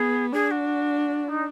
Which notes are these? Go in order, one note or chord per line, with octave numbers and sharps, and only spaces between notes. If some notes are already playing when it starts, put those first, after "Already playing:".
Already playing: B3 G#4
D4 G#4
F#4
D#4